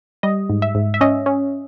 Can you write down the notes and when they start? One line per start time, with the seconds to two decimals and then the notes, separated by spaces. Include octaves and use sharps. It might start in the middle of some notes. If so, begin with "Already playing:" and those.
0.23 G3 D#5
0.49 G#2
0.62 E5
0.75 G#2
0.94 E5
1.01 C#4 D#5
1.26 C#4